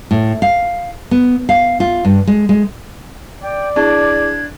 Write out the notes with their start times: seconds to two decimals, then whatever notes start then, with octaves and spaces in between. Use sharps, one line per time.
0.11 A2
0.42 F5
1.11 B3
1.49 F5
1.80 F4
2.05 G2
2.27 G#3
2.49 G#3
3.42 D5 G5
3.76 D4 E4 G#4 A5 G#6